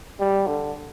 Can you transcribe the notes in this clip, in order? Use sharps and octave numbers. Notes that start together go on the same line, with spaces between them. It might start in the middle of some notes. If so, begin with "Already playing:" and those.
G3
D3